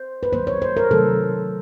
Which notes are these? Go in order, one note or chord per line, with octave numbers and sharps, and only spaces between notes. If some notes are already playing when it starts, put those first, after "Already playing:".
Already playing: C5
B4
D#3 F#3 A#3 C5
C#5
C5
A#4
C3 D#3 F#3 A3 A4